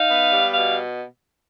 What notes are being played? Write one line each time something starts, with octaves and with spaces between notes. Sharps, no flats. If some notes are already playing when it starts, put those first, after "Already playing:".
Already playing: D#4 F5
B3
G3
B2 F5